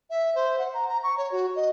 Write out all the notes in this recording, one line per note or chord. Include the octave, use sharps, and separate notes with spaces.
E5
C5
F#5
A#5
A#5
C#6
C#5
F#4
D#5